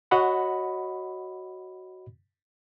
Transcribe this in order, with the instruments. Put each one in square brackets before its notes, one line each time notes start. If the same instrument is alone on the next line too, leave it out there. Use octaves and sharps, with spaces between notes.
[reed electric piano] F#4 C#5 D#5 F#5 B5